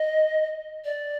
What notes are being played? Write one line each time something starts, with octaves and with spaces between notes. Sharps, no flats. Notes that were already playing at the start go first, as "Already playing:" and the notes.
Already playing: D#5
D5